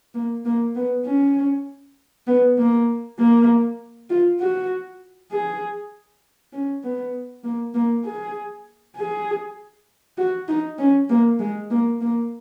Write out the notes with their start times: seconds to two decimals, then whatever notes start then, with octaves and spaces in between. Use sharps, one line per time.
0.14 A#3
0.45 A#3
0.76 B3
1.06 C#4
2.27 B3
2.58 A#3
3.19 A#3
4.10 F4
4.40 F#4
5.31 G#4
6.53 C#4
6.84 B3
7.44 A#3
7.75 A#3
8.05 G#4
8.96 G#4
10.17 F#4
10.48 D#4
10.79 C#4
11.09 A#3
11.40 G#3
11.70 A#3
12.00 A#3